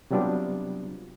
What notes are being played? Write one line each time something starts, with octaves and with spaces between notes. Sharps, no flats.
C3 F#3 G3 B3 D4 F4